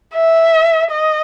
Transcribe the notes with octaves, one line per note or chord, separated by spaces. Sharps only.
E5
D#5